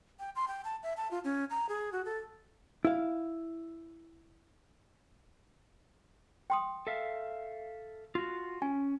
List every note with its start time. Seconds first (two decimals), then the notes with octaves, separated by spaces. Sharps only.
0.19 G5
0.36 C6
0.48 G5
0.65 A5
0.83 E5
0.97 A5
1.11 F4
1.24 C#4
1.50 A#5
1.69 G#4
1.92 F#4
2.05 A4
2.85 E4 F5
6.50 G5 C6 D#6
6.87 A4 E5 F5
8.15 F4 F#4
8.62 C#4 G#5